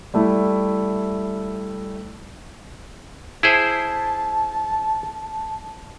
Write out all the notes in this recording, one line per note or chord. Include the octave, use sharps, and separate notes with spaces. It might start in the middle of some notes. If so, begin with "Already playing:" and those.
G3 A3 E4
E4 G#4 C5 A5